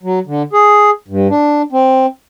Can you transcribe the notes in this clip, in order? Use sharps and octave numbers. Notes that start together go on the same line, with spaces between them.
F#3
D3
G#4
G2
D4
C4